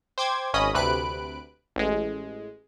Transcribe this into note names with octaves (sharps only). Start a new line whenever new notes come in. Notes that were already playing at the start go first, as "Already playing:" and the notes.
C5 G5 D6 G#6
G#1 C#4 D#5 B5 D#6
D2 C3 B4 F#6 D7
A1 G#3